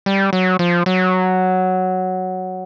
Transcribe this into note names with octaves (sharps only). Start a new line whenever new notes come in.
G3
F#3
F3
F#3